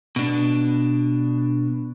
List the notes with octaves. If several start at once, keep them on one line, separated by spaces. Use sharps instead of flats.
B2 D4